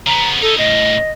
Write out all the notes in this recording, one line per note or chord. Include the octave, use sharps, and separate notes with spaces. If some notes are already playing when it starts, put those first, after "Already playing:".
C#3 B3 A#5
D#4 E4 A4
A2 C#3 D#5